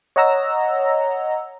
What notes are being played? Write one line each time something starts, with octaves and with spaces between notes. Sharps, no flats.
C#5 D#5 F#5 A#5 E6 A#6